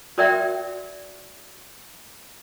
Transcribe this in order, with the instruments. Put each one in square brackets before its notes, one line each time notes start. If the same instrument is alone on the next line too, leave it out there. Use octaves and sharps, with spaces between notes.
[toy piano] F#4 A#4 D5 E5 G5